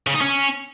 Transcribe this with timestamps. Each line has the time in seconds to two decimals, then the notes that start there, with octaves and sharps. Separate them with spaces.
0.07 C#3
0.14 D#4
0.21 C#4